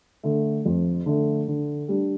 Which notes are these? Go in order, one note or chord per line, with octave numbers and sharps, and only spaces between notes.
D3 A3
F2
D3 A3
D3
G3 D4